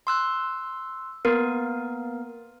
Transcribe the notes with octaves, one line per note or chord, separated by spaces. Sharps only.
C6 E6 F#6
A#3 B3 A#4